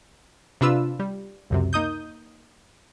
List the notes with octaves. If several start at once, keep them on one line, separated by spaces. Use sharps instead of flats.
C3 D4 F4 B4 E6
G3
C#2 F#2 C3
A#3 D#4 D#6 G6